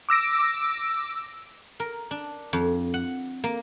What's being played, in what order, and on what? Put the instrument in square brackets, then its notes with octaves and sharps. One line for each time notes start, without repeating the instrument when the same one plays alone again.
[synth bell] D6 E6 A#6 D7
[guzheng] A#4
D4
F2
F#5
A#3